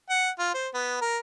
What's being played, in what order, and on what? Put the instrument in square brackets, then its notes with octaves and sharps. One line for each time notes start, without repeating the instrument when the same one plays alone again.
[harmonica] F#5
F4
C5
B3
A#4